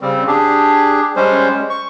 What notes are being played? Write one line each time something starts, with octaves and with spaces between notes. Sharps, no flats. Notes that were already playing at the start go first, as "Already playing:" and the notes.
C#3 G3 C4
D4 G4 G#4
G3 G#3 C#4 C5
C#6